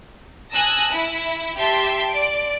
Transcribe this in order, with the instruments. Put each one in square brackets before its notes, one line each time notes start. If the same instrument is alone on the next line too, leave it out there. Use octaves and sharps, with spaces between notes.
[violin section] G#5 A5 D#6 E6 F#6 A#6
E4
G4 E5 A5 C6
D5 D7